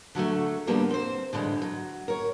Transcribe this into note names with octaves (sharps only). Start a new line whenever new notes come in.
D3 F#3 G#3 A3
D3 F3 G3 A#3 B3
C4 C5
D3 E3 F3 G3 G#3
F#3
A#4 C#5